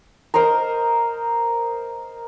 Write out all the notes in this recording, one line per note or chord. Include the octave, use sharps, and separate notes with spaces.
A#4 C5 D#5 A#5